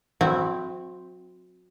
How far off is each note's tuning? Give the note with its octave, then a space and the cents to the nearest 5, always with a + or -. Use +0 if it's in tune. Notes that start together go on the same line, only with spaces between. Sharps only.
F#3 -30 C4 +0 E4 +0